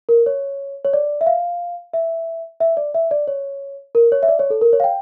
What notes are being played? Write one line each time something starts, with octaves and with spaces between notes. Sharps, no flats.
A#4
C#5
C#5
D5
E5
F5
E5
E5
D5
E5
D5
C#5
A#4
C#5
E5
D5
C#5
A4
A#4
C#5
F5
G5